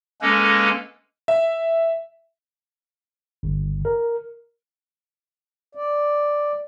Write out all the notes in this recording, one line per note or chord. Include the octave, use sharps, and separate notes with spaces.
G#3 A#3 C#4 A4 B4
E5
G1
A#4
D5